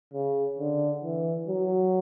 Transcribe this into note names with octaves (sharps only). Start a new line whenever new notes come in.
C#3
D3
E3
F#3